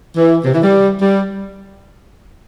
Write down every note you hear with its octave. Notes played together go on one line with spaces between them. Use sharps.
E3
C3
E3
G3
G3